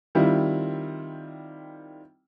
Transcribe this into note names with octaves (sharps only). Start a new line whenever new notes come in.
D#3 G3 C4 E4 F4